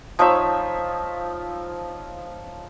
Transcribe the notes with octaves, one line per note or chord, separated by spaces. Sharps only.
F3 D#4 C#5 E5